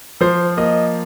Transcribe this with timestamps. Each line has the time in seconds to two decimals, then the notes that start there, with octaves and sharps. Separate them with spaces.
0.21 F3 C5
0.57 A#3 D#5